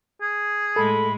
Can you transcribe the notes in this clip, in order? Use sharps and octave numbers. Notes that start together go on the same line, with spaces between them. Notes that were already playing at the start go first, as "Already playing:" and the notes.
G#4
A2 G#3 A3 A4 B5